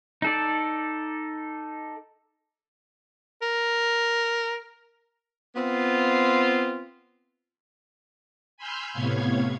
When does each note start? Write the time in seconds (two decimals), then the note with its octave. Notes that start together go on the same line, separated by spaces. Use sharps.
0.22 D#4 A4 D5
3.42 A#4
5.56 B3 C4 F4
8.57 G#5 B5 C6 E6 F6 G6
8.93 A2 C3 B3 C#5 F5 G#6